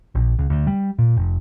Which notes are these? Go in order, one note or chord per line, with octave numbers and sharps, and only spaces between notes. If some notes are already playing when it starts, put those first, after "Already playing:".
A#1
C#2
D2
G3
A#2
F1